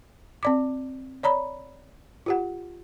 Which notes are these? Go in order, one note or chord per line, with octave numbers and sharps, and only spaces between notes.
C4 D5 D6
C#5 D5 A#5 B5
F4 G4 F#5